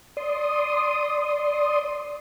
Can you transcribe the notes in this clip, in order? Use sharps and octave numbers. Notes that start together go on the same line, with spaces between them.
D5 C6 D#6